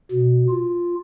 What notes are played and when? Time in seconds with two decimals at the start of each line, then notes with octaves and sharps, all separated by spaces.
0.12 B2
0.49 F4